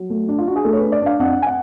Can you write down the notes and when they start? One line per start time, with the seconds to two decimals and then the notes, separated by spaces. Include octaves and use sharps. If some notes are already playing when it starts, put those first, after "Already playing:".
Already playing: F#3
0.10 A3
0.28 D4
0.38 F4
0.47 D4 F#4
0.56 G#4
0.64 A3 A4
0.73 C#5
0.79 D4 B4
0.92 D5
1.02 D4 F5
1.19 F2 F#5
1.42 G#5
1.47 F#5